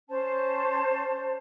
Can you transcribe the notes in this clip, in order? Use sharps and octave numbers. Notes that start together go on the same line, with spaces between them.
C#4 C5 A5